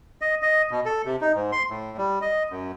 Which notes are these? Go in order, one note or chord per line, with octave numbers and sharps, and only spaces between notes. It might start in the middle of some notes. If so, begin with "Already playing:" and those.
D#5
D#5
B2
A4
C3
D#4
G#2
C6
A2
G3
D#5
F#2